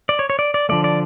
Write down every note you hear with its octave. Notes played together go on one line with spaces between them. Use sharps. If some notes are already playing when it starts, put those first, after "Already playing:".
D5
C#5
C#5
D5
D5
D3 F3 A3 D5
D5